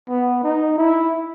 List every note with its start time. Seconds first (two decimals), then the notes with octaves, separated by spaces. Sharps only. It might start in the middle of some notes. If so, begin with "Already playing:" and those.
0.09 B3
0.43 D#4
0.78 E4